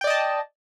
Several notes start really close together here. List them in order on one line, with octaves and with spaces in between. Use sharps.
G5 D5 D#5 A5